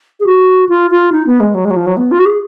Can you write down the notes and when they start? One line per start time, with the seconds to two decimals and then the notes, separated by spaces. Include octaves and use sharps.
0.20 G#4
0.26 F#4
0.69 F4
0.90 F4
1.12 D#4
1.26 B3
1.40 G#3
1.54 F#3
1.65 G#3
1.70 F#3
1.76 F3
1.86 F#3
1.96 B3
2.11 F4
2.19 F#4
2.25 G#4